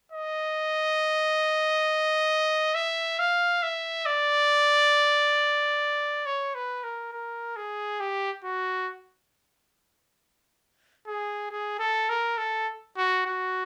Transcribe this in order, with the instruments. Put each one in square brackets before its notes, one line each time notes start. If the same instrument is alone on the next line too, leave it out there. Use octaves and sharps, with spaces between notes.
[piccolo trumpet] D#5
E5
F5
E5
D5
C#5
B4
A#4
A#4
G#4
G4
F#4
G#4
G#4
A4
A#4
A4
F#4
F#4